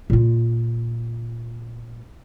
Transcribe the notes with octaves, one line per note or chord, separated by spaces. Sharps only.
A#2 F4